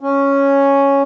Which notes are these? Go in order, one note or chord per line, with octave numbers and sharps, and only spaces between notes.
C#4